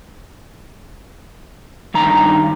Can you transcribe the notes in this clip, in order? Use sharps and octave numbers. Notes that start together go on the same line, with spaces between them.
G2 D#3 A#5